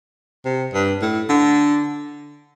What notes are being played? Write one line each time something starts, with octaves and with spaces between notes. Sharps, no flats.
C3
G2
A2
D3